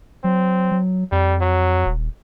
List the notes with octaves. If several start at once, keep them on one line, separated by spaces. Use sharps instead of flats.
F#3 C4
F#3
F2 G3
F#3
D#1